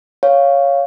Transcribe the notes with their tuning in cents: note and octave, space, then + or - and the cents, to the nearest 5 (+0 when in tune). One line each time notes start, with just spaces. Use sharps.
C#5 +0 F5 +0